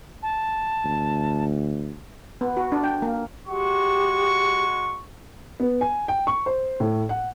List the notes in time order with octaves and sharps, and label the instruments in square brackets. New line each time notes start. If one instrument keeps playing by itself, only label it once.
[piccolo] A5
[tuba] D2
[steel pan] B3
F#4
D4
G5
A#3
[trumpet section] G#3 F#4 C#6 [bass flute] G4
[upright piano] B3
G#5
G5
C#6
C5
A2
F#5